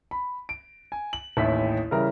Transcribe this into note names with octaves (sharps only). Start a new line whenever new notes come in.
B5
D7
G#5
F#7
A1 D#2 E4 B6
C#3 E3 G3 E4 A#4